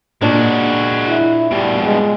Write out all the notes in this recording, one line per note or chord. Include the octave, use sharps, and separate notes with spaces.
A#2 G#3 D4 F#4
E4
G2 B2 G3
G#3